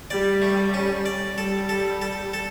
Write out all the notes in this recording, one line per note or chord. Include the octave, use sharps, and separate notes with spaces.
G3 D5
A3
C#4
D5
G3 A4
A4
A4
A4